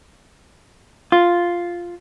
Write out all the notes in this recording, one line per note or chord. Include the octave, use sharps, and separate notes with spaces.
F4